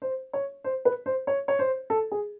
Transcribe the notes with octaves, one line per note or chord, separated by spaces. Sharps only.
C5
C#5
C5
B4
C5
C#5
C#5
C5
A4
G#4